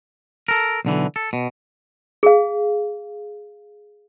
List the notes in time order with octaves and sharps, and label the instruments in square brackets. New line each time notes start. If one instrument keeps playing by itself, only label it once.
[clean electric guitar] A4 A#4
B1 D3 E3
A4
B2
[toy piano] G#4 F5